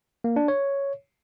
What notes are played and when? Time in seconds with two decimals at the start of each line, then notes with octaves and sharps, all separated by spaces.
0.24 A#3
0.36 D4
0.48 C#5